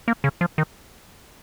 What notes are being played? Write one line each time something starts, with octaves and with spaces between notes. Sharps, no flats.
A#3
C#3
F3
D#3